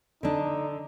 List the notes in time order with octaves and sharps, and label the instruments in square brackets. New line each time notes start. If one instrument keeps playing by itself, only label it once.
[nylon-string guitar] D3 D4 [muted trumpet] D#4